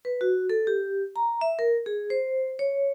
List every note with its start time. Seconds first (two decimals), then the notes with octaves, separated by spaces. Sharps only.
0.05 B4
0.21 F#4
0.50 A4
0.67 G4
1.16 A#5
1.41 E5
1.59 A#4
1.86 G#4
2.10 C5
2.59 C#5